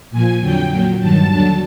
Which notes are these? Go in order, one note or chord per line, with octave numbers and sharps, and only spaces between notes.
A#2 F3 G#5
F2 D3 F#3 G5
A#2 F#3
G2 D#3 F#3 A5
D#2 D3 F#3